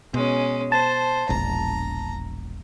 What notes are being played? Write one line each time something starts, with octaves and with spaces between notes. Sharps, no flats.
B2 G#3 C#4
C5 A5
E1 A#1 A#5